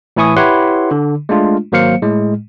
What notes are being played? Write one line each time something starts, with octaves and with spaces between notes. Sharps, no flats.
A2 E3 E4 G#5 C#6 D#6
E4 G4 B4 C#5 F#5 C6
D3
G#3 A3 D4 F4
G#1 F#3 A#3 C5 F5 C#7
A2 G#3